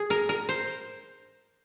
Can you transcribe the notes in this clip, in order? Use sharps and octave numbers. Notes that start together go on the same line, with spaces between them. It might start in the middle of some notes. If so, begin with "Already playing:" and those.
Already playing: G#4
A#4
A#4
C5